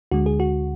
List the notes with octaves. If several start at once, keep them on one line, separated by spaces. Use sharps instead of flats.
D2 D3 G#3 F#4
G#4
F#4